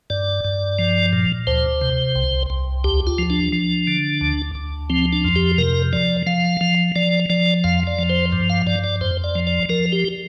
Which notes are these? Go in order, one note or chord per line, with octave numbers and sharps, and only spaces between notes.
G2 D5
G2
F3
A#2
D2 C5
C3
C2
C2
D2 G4
F4
F3
D4
F3
D3
D2
D2
F3 C4
D4
F2
G4
C3 A#4
F3 D5
F3 F5
F3
F3 D5
F3 D5
F2 F5
D5
F3
C5
G2
F5
G2 D5
D5
F2 C5
D5
F3
D5
F3 A#4
G4